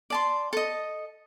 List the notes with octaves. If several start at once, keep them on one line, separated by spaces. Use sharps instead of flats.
D5 A5 C6
A4 D#5